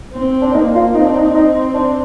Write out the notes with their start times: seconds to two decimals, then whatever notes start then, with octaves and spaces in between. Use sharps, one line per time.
0.14 C4
0.41 D4
0.54 A#3 D#4
0.74 F4
0.94 C4 D#4
1.06 D4
1.18 D#4
1.34 D#4
1.74 D4